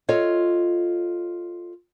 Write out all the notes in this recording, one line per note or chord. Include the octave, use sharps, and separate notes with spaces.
F4 A4 C#5 D#5